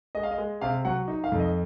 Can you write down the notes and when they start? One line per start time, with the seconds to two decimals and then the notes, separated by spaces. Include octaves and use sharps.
0.15 G#3 D#5
0.23 F5
0.31 D#5
0.38 G#3
0.61 C3 F5
0.85 F#3 F#5
1.08 D#4
1.24 F5
1.32 F2
1.40 D#5